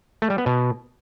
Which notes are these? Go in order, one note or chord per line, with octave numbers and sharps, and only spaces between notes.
A3
G3
B3
B2